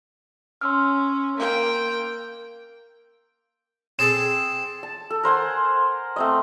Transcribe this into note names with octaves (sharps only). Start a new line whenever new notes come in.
C#4 C6 E6 F6
A#3 G5
C4 G#4 A4 E7
A5
A4
A#4 C5 F#5 G#5
A3 C4 D#5